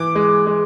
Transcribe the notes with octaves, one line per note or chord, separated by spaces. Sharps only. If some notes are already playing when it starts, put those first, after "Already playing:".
Already playing: E3 D6
G#3
G#3